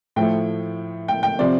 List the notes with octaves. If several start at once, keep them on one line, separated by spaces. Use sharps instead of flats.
A2 F3 A3 G5
G5
G5
C3 F3 C4 D5